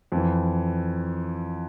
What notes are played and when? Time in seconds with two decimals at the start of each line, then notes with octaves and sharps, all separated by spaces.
0.12 F2 E3